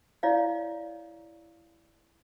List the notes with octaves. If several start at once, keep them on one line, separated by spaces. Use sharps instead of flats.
E4 C#5 D5 F5